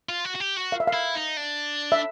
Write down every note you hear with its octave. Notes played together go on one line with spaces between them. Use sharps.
F4
F#4
F#4
G4
F#4
F5
E5
F5
E4
D#4
D4
E5